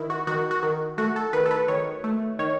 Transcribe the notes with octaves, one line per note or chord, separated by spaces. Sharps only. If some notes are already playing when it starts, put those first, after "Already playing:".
Already playing: D#3 E4
F#4
D#3 F#4
F#4
D#3
A3 F#4
A4
D#3 B4
A4
B4
D#3 C#5
A3
D#3 C#5